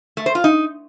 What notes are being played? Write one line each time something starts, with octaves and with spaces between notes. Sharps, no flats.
A3
C5
F4
D#4